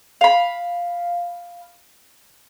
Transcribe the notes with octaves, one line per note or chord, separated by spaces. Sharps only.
F5 B5